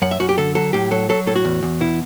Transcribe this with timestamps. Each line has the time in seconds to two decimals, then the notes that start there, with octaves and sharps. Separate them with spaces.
0.02 F#2 F#5
0.11 E5
0.20 F#2 F#4
0.29 G4
0.38 D3 A4
0.55 F#3 A4
0.73 A2 G4
0.91 F#3 A4
1.09 F#3 A4
1.27 A2 A4
1.36 F#4
1.45 E2
1.63 E2
1.80 B2 E4